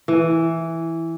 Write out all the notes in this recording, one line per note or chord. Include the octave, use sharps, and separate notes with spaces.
E3